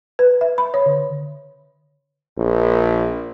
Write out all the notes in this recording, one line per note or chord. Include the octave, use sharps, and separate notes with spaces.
B4
E5
B5
C#5
D3
A#1